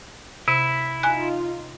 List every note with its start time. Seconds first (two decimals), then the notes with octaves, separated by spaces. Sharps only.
0.48 C3 E4
1.03 D#4 F4 G#5 F#6